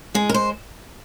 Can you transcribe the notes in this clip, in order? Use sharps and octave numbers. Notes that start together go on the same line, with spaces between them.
G#3 G#4
A#4
C5